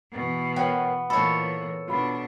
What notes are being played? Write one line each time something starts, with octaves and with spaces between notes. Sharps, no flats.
B2 E3
B3 A#4 C#5 G5
A#2 E3 A4 C5 C#5 D#5 B5
B2 D4 F4 B5